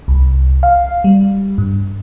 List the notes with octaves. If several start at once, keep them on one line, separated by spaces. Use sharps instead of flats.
C2
F5
G3
G2